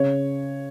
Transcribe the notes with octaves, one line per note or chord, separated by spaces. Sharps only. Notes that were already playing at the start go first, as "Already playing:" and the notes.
Already playing: C#3 C#5